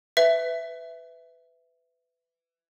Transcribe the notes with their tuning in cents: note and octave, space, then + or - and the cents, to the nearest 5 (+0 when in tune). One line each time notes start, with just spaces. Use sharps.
B4 +20 E5 +0